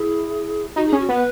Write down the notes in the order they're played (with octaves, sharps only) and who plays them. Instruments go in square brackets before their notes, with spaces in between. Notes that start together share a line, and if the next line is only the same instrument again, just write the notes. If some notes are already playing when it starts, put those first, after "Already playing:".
Already playing: [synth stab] E4 [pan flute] G#4
[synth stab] D#4 [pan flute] F#4
[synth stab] C#4 [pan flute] G#4
[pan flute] F#4
[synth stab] B3 [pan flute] B4